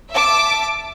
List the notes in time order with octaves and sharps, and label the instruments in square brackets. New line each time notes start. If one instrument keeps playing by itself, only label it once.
[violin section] E5 A5 D6